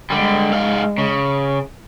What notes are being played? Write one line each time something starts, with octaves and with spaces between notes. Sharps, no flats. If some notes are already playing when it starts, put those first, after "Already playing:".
D3 G3 G#3
G#2 F5
C#3